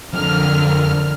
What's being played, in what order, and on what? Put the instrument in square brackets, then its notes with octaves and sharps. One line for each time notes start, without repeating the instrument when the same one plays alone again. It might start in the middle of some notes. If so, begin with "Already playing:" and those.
[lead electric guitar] F2 [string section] D3 A#4 F6